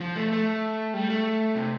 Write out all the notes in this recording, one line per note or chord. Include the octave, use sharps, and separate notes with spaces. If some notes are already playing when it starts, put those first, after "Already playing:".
F3
A3
A3
G3
A3
C3